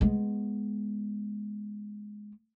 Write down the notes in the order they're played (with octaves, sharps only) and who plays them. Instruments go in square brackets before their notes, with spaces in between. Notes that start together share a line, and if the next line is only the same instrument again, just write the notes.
[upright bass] G#3 B3